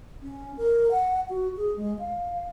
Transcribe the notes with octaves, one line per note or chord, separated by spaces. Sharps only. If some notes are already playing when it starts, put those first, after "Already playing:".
C#4
A#4
F#5
F#4
G#4
G#3
F5